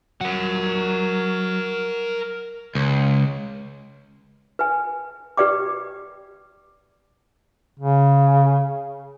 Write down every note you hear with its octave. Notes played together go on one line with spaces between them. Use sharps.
F#3 A#4 F#5
C#2
B4 G#5
G4 B4 D5 G5 D6
C#3